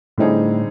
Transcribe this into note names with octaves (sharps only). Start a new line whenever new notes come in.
A2 D3 G3 C4 D#4 G#4